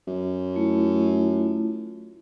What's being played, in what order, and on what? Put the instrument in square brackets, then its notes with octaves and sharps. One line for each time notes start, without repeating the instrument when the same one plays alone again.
[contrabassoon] F#2
[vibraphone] A3 E4 F4